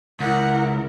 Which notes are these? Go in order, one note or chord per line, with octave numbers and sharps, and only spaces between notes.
C#2 E4 A#4 F#5